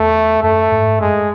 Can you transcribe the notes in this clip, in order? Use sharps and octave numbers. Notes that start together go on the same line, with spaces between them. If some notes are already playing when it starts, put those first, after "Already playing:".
Already playing: E2 A3
F#2 A3
G#2
F#2 G#3